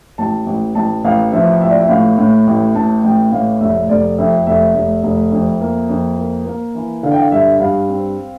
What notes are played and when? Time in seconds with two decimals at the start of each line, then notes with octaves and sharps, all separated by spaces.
0.18 A1 A5
0.47 A1
0.75 A1 A5
1.04 A1 F5
1.32 F3 E5
1.61 A1 E5
1.70 D5
1.80 E5
1.89 A2 F5
2.18 A2
2.47 A1
2.75 A2 A5
3.04 A1 G5
3.32 A2 F5
3.61 F1 E5
3.89 F1 D5
4.18 F2 E5
4.47 F1 E5
4.74 F1
5.03 F1
5.32 F2
5.61 A#3
5.89 F2
6.18 A#3
6.46 A#3
6.75 E3
7.03 D3 F5
7.12 G5
7.19 F5
7.32 G2 E5
7.60 G2 F5
7.89 C4